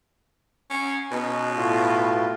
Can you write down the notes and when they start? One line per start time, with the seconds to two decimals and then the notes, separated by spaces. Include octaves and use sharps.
0.70 C#4
1.11 B2 C#4 D#4
1.56 A2 A3 F4